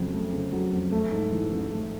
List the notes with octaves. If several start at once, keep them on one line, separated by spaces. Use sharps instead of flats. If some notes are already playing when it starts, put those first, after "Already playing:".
Already playing: F2 C#3 F#3 A3
A3
C#3
F#3
F2
A3
G#2
E3
A1
A3